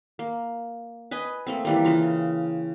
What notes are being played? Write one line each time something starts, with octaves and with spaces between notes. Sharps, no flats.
A#3
B4 D#5 G#5
A3 A#3 C4
E3 G3 A#3
C#3 E3 F4